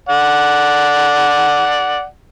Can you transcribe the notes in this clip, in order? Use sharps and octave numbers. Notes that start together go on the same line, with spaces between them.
D5 F#5